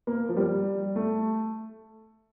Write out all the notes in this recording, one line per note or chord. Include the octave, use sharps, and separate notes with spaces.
A#3
F3
G3
A3